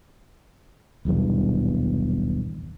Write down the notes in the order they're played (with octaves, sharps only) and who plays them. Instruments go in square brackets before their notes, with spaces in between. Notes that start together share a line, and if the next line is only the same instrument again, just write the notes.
[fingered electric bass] D#1 B1 E2 G2